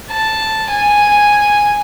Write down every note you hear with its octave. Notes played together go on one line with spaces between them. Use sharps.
A5
G#5